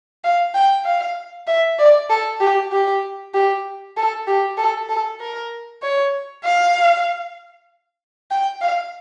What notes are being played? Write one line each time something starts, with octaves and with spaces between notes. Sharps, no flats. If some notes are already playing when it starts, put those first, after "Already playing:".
F5
G5
F5
E5
D5
A4
G4
G4
G4
A4
G4
A4
A4
A#4
C#5
F5
G5
F5